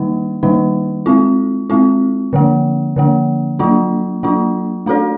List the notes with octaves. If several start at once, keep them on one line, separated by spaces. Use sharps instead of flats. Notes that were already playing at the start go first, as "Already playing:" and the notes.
Already playing: D#3 G3 A#3 D#4
D#3 G3 A#3 D#4
G#3 C4 F4
G#3 C4 F4
D3 F3 A#3
D3 F3 A#3
F#3 A#3 D4 F4
F#3 A#3 D4 F4
A3 D4 F#4 A4 D5